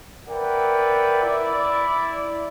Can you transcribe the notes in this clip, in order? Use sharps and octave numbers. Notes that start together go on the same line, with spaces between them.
A#4 B4 D5 E5 F#5 G5
E4 D5